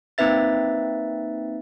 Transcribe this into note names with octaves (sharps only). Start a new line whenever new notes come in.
A#3 C4 D#4 B4 E5 A6